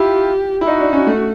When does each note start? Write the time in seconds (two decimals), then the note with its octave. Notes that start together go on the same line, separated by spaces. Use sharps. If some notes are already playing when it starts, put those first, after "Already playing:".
Already playing: E4 F4 G4
0.61 E4
0.67 D#4 F#4
0.80 D4
0.93 C#4
1.07 A3